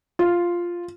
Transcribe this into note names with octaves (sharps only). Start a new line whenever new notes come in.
F4